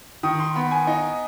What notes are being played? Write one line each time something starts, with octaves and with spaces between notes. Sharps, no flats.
D#3 D#6
C6
B3 B5
G#5
D#4